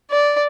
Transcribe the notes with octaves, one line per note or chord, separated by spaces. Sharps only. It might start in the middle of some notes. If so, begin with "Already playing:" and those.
D5